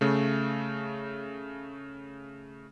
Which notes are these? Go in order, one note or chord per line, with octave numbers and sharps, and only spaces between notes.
C#3 A3